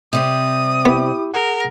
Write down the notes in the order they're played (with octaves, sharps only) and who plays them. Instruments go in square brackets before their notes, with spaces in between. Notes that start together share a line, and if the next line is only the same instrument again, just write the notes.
[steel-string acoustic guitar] C3 G3 C4 [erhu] D#6
[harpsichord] B3 [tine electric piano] E4 G4
[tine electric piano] G#4 F#5 [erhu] A#4